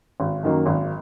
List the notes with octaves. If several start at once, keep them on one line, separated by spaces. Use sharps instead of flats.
G#1
F#2 D#3 F#3 A#3
G#1